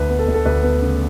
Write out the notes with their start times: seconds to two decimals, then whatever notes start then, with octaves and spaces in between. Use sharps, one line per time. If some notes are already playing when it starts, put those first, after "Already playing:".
Already playing: D2 B4
0.09 B3
0.19 A4
0.28 D2
0.34 A4
0.45 D2 B4
0.63 B3
0.82 C#3